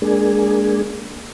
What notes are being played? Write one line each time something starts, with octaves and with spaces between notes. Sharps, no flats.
G#3 A#3 D4 G#4